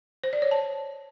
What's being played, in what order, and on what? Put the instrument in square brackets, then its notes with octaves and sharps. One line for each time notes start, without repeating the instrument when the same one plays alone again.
[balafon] C5
D5
C#5
A5